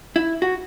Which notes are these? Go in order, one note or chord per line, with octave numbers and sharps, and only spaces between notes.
E4
F#4